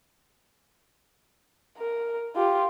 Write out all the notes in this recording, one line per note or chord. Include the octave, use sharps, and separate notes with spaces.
A#4
F4 G4